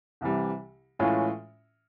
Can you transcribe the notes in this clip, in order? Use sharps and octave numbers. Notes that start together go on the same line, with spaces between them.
C2 C3 E3 G3
A2 E3 G#3 C#4 F4